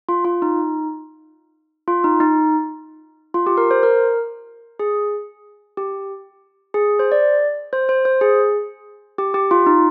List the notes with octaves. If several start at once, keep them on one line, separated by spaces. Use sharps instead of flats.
F4
F4
D#4
F4
D#4
D#4
F4
G4
A#4
C5
A#4
G#4
G4
G#4
C5
D5
C5
C5
C5
G#4
G4
G4
F4
D#4